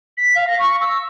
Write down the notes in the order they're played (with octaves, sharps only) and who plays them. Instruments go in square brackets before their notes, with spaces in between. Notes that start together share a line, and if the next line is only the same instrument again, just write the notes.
[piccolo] B6
F5
A#6
C#6
E6